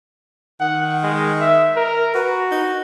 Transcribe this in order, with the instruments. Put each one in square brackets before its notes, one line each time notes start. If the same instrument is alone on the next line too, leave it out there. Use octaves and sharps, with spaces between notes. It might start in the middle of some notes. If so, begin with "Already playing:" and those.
[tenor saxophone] D#3 [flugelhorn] F#5
[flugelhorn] G#3
E5
A#4
[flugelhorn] F#4 [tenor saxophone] B4
[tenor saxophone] D#4